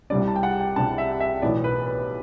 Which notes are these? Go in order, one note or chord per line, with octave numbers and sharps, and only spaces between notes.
C2 C3 G3 D4 D5
A5
G5
F#5
G5
C2 C3 G3 D4 A5
E5
E5
B1 A2 E3 B3 D5
B4
B4